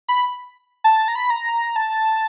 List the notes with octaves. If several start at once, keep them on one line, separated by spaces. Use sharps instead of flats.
B5
A5
A#5
B5
A#5
A5